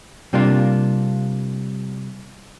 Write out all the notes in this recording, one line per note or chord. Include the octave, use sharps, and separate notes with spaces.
C3 G3 A#3 D4 F4